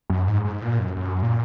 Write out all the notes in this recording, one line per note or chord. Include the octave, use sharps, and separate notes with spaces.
F#2
G#2
G#2
A#2
F#2
F#2
A#2